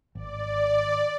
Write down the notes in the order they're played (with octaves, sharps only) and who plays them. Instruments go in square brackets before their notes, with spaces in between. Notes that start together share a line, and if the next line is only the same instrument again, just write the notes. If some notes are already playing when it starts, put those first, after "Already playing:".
[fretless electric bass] G#1 [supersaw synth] D5